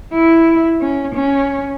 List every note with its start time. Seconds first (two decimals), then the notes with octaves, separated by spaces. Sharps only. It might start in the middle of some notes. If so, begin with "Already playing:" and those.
0.14 E4
0.81 C#4
1.15 C#4